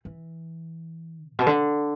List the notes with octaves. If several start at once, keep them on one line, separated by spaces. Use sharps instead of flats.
E3
A2
B2
D3